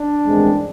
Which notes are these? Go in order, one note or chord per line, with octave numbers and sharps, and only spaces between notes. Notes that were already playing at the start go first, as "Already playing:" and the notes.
Already playing: D4
A1 G2 D#3 G#3 C4